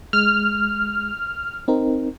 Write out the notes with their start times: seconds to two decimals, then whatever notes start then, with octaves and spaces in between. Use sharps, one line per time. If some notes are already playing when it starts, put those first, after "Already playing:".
0.13 G#3 F6
1.68 C4 D#4 A#4